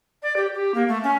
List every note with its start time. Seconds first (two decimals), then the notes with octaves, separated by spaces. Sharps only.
0.23 D5
0.36 G4
0.54 G4
0.74 A#3
0.88 A3
1.04 C#4